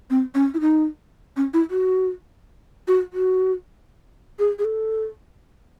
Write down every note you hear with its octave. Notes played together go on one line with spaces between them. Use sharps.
C4
C#4
E4
D#4
C#4
E4
F#4
F#4
F#4
G#4
G#4
A4